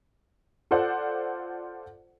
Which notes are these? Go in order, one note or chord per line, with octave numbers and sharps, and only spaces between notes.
F4 A4 C5 D5 F#5